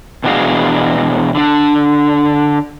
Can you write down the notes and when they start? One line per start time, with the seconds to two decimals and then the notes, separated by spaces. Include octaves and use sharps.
0.24 B2 E3 D4 F#4 G#4 F5
1.35 D3 D4